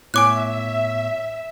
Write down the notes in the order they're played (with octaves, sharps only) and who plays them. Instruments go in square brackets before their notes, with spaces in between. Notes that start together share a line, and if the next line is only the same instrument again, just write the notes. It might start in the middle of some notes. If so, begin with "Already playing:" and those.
[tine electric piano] A2 B3 C#5 [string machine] E5 [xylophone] G#5 D6 F#6